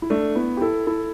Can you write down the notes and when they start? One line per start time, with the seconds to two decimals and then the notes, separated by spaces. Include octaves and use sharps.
0.02 E4
0.10 A3 D4
0.36 B3 E4
0.57 G4
0.61 E4 A4
0.87 E4 A4